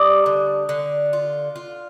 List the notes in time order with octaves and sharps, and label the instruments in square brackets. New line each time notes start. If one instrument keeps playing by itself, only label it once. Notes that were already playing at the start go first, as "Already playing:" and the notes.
Already playing: [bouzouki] G3 [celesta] D6 D#6
[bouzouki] D3
D3
F4
F4